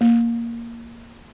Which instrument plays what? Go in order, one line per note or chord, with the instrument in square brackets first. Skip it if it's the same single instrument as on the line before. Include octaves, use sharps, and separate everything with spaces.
[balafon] A#3